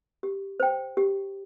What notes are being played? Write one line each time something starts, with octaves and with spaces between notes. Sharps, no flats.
G4
C5 G5
G4